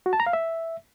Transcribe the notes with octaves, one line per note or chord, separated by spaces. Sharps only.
F#4
A5
A#5
F5
E5